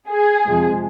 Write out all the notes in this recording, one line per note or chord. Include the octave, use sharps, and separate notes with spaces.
G#4
F2 C3 F3 G#3